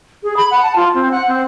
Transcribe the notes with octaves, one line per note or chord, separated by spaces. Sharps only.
G#4
B5
F#5
A5
F4
C4
F#5
C4